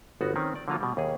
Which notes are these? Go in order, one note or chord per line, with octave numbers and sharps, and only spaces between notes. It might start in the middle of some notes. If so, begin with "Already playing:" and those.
G1 B3 D#4 F#4
D#3 C4 C#4
D5
D3 F#3 A#3 F4 A4
B2 G3
D#2 G#4